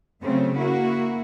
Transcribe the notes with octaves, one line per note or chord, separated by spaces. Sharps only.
C#3 F#3 A3 C4
A#3 E4 F#4